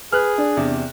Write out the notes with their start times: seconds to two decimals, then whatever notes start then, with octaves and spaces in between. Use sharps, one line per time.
0.12 G#4 B4 F6 F#6
0.38 D4
0.57 E2 C3